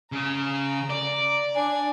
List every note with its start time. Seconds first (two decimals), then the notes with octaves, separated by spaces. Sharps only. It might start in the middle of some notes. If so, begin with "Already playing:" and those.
0.12 C#3 A#5
0.90 D5
1.54 D4 G#5